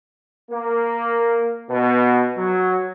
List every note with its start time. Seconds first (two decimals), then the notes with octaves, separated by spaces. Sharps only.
0.51 A#3
1.71 B2
2.37 F#3